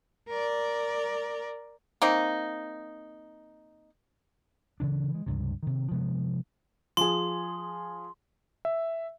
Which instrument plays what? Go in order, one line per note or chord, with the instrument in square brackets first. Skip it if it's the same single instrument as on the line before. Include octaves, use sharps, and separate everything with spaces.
[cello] A#4 D5
[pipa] A#3 C4 D#4
[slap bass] D2 C#3 E3 D4
E3 G#3
C#2 G2 C3
C3 D#3
C3 F3 G#3 B3
[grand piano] F3 G#4 [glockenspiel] C6
[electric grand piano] E5